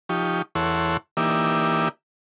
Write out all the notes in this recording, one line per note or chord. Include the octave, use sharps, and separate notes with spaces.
F3 D#4 G4 C#6
E2 E4 A4 C#5 F#5 C6
E3 A#3 D#4 G4 D5 E5